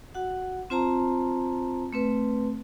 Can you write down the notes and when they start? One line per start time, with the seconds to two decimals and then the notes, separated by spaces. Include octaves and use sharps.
0.15 F#4 F#5
0.70 C4 F4 C5 A5 A#5
1.93 A3 C4 B4